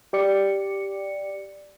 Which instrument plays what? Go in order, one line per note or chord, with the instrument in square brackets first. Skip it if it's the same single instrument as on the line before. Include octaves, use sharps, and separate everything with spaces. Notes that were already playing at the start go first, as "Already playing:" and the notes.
[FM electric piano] G4 D5 C#7